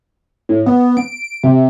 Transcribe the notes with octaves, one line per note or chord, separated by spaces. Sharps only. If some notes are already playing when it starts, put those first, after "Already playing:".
A2
B3
D7
C3